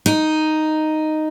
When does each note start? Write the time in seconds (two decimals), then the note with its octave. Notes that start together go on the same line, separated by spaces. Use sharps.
0.06 D#4